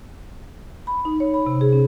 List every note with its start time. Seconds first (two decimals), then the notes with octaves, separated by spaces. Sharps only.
0.87 B5
1.05 D#4
1.20 C#5
1.34 B5
1.46 C3
1.61 G#4
1.73 C#4